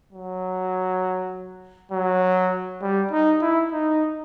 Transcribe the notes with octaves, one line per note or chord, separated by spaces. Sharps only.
F#3
F#3
G3
D#4
E4
D#4